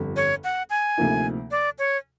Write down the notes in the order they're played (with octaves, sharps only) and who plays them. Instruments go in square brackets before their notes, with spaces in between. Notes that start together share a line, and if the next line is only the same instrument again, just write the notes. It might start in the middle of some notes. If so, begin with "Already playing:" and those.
Already playing: [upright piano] G1 F2 D3 G3
[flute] C#5
F#5
G#5
[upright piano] D2 C3 F3 A#3 D#4
[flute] D5
C#5